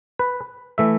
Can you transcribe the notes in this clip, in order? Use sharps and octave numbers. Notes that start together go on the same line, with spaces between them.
B4
E3 A3 E5